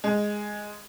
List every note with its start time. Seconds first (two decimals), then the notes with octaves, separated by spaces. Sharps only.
0.04 G#3